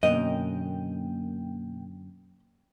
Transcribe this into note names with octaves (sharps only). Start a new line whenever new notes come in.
F#2 B2 D3 A#3 D#5 G5